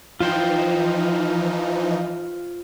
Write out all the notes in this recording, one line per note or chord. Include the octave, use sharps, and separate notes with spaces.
E3 F3 D#4 F4 C5 G5